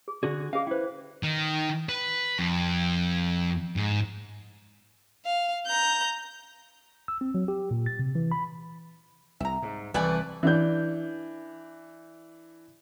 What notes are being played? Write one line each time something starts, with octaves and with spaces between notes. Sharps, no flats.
G#4
D3 F#4 G#4 D5
C#4 G#4 D#5 F5
E4 B4 C5 G5
D#3
B4
F2
G#2
F5
A#5 G6
E6
C4
F#3
G4
A#2
A6
C3
E3
B5
C2 E5 A#5
G#2
C2 G#2 E3 A3 B4 D5 G#5
E3 D4 G6